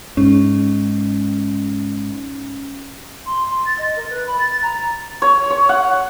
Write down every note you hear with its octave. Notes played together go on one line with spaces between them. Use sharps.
G#2 C#4
C6
C6
A6
D#5
A#4
B4
B5
A6
A#5
C#5
C#5
F#5